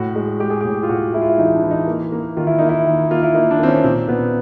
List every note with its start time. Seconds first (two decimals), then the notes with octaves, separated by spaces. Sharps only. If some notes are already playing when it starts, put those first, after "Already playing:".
Already playing: A2 F#4
0.16 G#3
0.40 G#3 G4
0.50 G#4
0.61 G4
0.64 A2
0.83 F4
0.89 A2 F#4
1.14 G#3 E4
1.21 F4
1.29 E4
1.38 E3 D#4
1.55 D4
1.63 E3
1.71 D#4
1.87 A#3
2.12 A#3
2.37 D#3 F4
2.47 E4
2.58 A#3 D#4
2.69 E4
2.86 D#3
3.11 A#3 F4
3.23 E4
3.35 A#3 D#4
3.51 D4
3.59 D#3 C4
3.68 C#4
3.84 A#2 C4
4.08 A#2 B3